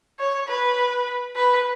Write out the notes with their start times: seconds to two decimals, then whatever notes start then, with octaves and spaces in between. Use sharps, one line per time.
0.19 C#5
0.48 B4
1.36 B4